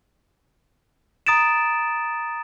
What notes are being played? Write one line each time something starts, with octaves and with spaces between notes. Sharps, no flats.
A#5 D#6 A6 D7 E7